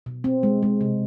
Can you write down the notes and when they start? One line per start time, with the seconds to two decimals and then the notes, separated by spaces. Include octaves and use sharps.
0.06 B2
0.24 C4
0.43 G#3
0.63 G#3
0.81 C3